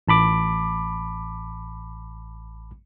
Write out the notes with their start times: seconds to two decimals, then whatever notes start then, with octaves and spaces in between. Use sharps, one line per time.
0.08 A1 A5 B5 D6